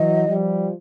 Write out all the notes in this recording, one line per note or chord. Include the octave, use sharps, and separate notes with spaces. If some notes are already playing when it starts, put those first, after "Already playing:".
Already playing: E3 F#3 D#5
F3 G3